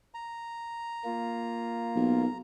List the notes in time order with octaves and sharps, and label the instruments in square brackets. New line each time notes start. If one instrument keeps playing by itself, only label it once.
[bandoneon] A#5
[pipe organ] A#3 F4
[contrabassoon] B1